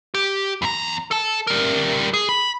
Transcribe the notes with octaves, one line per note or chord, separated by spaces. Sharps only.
G4
E2 A#5
A4 A5
G3 A#4
G#4
B5